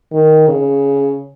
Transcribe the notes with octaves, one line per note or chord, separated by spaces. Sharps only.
D#3
C#3